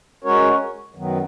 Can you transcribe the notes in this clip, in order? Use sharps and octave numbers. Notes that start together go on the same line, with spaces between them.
G#3 C#4 F#4 A#4 C#5
F#2 D#3 F#3 B3